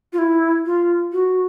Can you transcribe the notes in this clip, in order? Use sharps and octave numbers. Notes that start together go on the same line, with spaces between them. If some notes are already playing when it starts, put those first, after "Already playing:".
F4
E4
F4
F#4